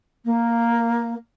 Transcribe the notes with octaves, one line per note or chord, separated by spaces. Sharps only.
A#3